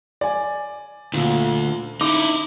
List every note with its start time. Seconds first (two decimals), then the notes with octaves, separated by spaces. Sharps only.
0.21 D5 G#5
1.13 D2 A#2
2.01 D#4 E4 D6